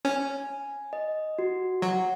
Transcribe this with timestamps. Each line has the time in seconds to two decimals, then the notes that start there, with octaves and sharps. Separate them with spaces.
0.05 C#4 G#5
0.49 G#5
0.93 D#5
1.39 F#4
1.82 F#3 F#5